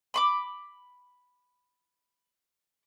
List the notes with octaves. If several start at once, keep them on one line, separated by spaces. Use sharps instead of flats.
B5 C6 D6